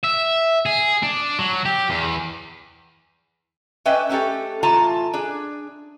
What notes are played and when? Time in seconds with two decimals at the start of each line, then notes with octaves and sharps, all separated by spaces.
0.04 E5
0.66 G#4
1.03 D4
1.39 F#3
1.66 G4
1.90 E2
3.85 C#4 D4 B4 D#5 E5 G5
4.09 A3 C#4 F#4 G4 A4
4.63 A2 E3 F4 A5 A#5
5.14 D4 G#4